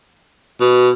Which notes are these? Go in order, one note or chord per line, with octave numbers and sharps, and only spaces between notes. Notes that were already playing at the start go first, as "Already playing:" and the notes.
B2